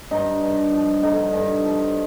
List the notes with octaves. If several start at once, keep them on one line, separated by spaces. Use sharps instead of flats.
G2 D#4
G2
F3
D3 D#4
G2
F3